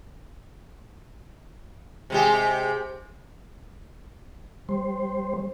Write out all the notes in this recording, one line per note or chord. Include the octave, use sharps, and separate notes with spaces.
C3 G#3 G4
G3 C5